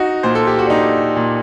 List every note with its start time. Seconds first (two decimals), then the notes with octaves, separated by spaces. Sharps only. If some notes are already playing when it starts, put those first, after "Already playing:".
Already playing: D#4 F#4
0.23 A#2 C5
0.35 A4
0.47 G4
0.59 F#4
0.66 D4
0.70 A#2 D#4
1.16 A#2